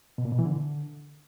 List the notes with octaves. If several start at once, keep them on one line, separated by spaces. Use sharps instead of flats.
B2
A#2
B2
E3
D3